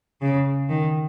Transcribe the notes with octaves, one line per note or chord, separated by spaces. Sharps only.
C#3
D#3